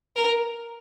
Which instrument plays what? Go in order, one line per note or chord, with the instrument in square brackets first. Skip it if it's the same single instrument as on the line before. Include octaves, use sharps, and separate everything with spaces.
[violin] A#4